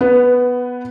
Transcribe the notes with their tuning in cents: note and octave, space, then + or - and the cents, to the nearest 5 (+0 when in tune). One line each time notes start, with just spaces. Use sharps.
B3 +0 B4 +20